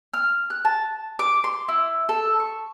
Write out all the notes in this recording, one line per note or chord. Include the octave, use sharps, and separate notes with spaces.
F6
F#6
A5
D6
C6
E4
A4
C#6